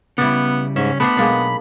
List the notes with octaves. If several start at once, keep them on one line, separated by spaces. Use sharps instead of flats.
C#3 G3 B3 E4 D5
G#2 C#4 E5
A3 B3 D4 C5 B5
B1 G#3 A#3 D4